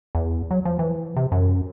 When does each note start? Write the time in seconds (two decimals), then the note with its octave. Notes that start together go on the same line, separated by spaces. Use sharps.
0.15 E2
0.51 F#3
0.65 F3
0.79 E3
1.16 C3
1.32 F#2